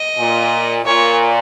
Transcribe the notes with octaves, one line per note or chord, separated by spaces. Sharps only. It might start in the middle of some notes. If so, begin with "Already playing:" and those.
Already playing: D#5
A#2
A#2 C#5